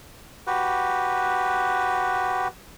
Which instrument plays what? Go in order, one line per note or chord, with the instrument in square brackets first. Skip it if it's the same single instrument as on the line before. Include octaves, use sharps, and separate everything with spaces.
[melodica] F#4 G4 B4